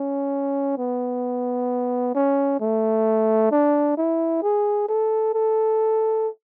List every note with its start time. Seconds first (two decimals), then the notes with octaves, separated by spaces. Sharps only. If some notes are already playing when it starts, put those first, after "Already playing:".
Already playing: C#4
0.78 B3
2.15 C#4
2.60 A3
3.51 D4
3.97 E4
4.42 G#4
4.88 A4
5.34 A4